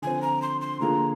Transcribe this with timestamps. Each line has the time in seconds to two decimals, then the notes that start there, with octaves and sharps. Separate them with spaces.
0.02 D3 F3 C4 G#5
0.22 A#5
0.42 C6
0.61 C6
0.80 D3 F3 A#3 F4 G#4 A#5